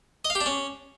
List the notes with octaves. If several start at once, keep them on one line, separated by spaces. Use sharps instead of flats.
D#5
F5
G4
D4
C#4